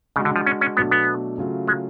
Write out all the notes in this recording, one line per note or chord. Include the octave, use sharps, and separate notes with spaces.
C#3 G#3 D4 F#4
D3
F3
C#4
C#4
B2 F#3 A3 B3 D4
B3
C#3 F#3 A3 F4
G#3